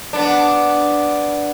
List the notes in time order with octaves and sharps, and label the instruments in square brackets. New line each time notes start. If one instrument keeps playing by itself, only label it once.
[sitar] B3 D4